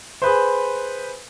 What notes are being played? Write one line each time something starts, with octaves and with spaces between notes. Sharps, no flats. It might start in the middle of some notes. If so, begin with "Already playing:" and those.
G#4 B4 C5